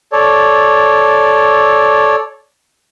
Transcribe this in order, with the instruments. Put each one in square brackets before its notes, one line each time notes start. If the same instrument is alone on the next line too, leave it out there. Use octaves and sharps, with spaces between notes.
[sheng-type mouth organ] A4 C#5 D5